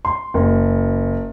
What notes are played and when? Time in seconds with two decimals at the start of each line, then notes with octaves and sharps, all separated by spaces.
0.05 C6
0.34 F#1